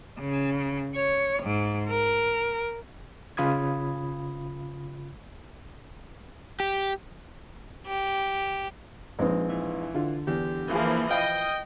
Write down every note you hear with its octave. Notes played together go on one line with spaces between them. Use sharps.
C#3
C#5
G#2
A#4
C#3 F4 B5 D#6 G#6
G4
G4
A#1 G#3 C4 D#4 B4
E3
D3 F4
E2 G4
E3 F3 A#3 F4 G#4
D#5 F5 G5